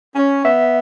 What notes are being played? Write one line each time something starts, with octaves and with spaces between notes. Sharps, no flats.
C#4
B3 E5